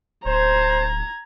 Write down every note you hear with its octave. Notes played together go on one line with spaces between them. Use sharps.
D1 C5 A#5 G#6